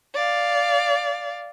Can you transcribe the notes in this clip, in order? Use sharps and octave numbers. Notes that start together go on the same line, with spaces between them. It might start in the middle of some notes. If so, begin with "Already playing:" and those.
D5 F5